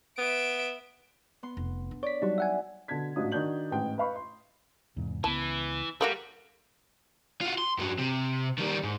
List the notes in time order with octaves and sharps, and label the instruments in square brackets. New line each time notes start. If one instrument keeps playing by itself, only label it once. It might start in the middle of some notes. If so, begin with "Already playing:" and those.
[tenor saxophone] B3 [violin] E5 D7
[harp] B3 C6
[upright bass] F1
D4
[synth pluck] C#5 B6 [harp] D5
[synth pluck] F#3 G3 D#4 [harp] F#4 A5
[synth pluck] E5 F#5 G#5
[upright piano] B2 D3 A5 G#6 B6
A1 G#2 F#3 D4 F4 D#6
D#3 D4 F#4 G6 F#7
A1 G#2 E3 D#4 G5
B4 D#5 F5 B5 C#6
C6
[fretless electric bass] E2 G#2 C3
[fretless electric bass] C#2 B3 [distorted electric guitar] E3 [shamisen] A5
[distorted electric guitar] G3 [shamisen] A3 A#3 F#4
[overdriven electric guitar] F4 F#4
C6
G2 F#3
C3
D#3 G3
G#2